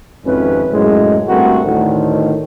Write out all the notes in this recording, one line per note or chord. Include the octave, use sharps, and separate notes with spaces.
G#1 F2 C3 C#4 B4
F#2 A2 C#3 G#3
G2 A3 C4 F#4 A#4
D2 A2 D3 D#3